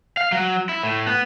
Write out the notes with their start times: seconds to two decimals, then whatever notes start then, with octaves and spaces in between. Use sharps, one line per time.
0.17 F5
0.32 F#3
0.69 E4
0.83 A2
1.07 B3